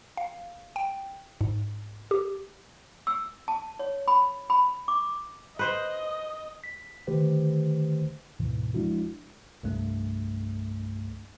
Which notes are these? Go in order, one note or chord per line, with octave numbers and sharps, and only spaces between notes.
F5
G5
G#2
G4
E6
A5
C#5
B5
B5
D6
B4 C5 D#5
B6
D3 D#3 A3 G4 B4 C5
D2 G#2 B2 E3
F3 G#3 D4 E4 F#4
C2 G2 A3